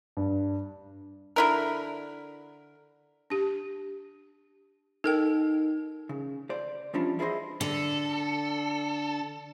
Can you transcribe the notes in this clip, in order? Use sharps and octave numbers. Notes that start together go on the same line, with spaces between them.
G2
D3 E4 A#4
D4 G4
D#4 A4 A#4 G5
C#3
C5 D5
E3 F3 G3 C#4 D4 F4
E4 G#4 A4 B4 C5 D#5
D3 A4